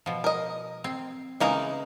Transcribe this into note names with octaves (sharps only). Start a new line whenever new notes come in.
B2 F3
A#4 D#5
C4
C#3 E3 G#3 A#3 D#4 A#4